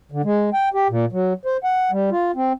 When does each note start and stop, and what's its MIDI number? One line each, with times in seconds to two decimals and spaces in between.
0.12 0.22 50
0.24 0.50 56
0.53 0.69 79
0.74 0.88 67
0.90 1.05 46
1.12 1.33 54
1.45 1.57 72
1.64 1.91 78
1.91 2.10 55
2.12 2.32 65
2.35 2.53 60